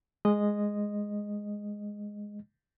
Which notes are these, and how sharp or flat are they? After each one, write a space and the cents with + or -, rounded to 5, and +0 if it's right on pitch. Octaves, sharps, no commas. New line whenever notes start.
G#3 +0 D#5 -10